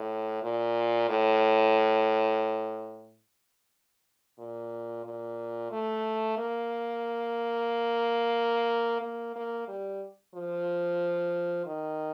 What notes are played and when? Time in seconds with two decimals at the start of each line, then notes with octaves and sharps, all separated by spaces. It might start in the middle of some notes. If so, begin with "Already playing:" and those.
Already playing: A2
0.43 A#2
1.09 A2
4.39 A#2
5.05 A#2
5.71 A3
6.38 A#3
9.01 A#3
9.36 A#3
9.68 G3
10.34 F3
11.66 D#3